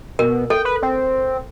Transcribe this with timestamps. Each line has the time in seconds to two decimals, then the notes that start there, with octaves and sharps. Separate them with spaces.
0.19 B2 A#4
0.50 A4 G5
0.65 B4
0.82 C4